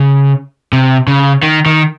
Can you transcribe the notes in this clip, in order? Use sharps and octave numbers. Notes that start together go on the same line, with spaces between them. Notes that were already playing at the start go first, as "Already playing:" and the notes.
Already playing: C#3
C3
C#3
D#3
D#3